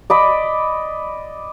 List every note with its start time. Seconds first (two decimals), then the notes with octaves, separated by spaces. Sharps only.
0.10 D5 D#5 B5